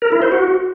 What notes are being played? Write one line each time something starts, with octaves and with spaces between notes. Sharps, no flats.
A#4
E4
C5
F#4